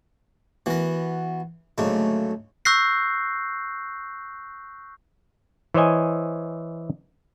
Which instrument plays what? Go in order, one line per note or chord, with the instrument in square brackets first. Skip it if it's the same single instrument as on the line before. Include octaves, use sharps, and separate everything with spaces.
[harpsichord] E3 A#4 [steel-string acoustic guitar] B3 F#4
[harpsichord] D2 G#2 C#3 [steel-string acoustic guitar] F#3 A3 A#3
[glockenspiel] C#6 E6 F#6 G6 A#6 C7
[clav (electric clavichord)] E3 C5 C#5 D#5 G#5